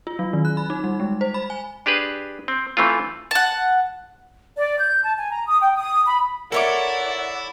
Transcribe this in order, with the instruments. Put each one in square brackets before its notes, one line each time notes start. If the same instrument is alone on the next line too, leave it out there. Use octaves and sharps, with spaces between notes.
[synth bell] F4
F#3
D#3
F#6
B5
D#4
G3
G#3
C5
B5
G#5
[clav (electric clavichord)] D4 G4 G#4 B4
C4
E3 A3 C4 F4
[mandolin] F#5 A5
[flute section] D5
G6
A5
G#5
A#5
D#6
G5
D#6
B5
[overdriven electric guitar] E4 [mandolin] A4 C#5 D6 [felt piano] A#4 E5 [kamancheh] D5 F#5